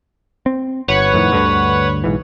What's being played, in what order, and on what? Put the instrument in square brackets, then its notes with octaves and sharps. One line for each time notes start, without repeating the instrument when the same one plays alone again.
[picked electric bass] C4
[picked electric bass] G1 [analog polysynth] B4 C#5 F#5
[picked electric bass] F2 A2 D#3
D2 G2 D3
B1 G#2 E3